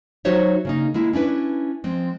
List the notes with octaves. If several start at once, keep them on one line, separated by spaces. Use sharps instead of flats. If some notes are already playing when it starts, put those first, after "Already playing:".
F#3 D#4 F#4 C5 C#5 E5
C#3 A#3 D#4
G#3 A#3 E4
C#4 D4 E4 B4
F3 G#3 C4